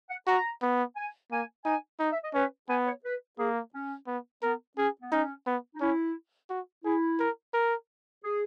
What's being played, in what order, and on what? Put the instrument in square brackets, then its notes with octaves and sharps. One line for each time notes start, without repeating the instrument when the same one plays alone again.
[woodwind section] F#5
[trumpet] F#4 [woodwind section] A#5
[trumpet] B3
[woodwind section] G#5
[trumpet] A#3 [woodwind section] G#5
[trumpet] D#4 [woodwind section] G#5
[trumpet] D#4
[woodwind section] E5
D#5
[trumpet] C#4 [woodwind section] B4
[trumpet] B3 [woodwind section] G#5
[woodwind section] C#5
B4
[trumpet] A#3 [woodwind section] G#4
[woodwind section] C#4
[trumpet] B3
[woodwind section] B3 [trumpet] A#4
[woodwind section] C#4 [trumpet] G#4
[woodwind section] B3
[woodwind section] C#4 [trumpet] D#4
[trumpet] B3
[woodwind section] D#4
[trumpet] C#4 [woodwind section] E4
[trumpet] F#4
[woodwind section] E4 [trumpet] G#4
[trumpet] A#4
A#4
[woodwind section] G#4